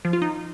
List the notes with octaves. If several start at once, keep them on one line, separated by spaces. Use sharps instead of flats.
F3
F4
D#4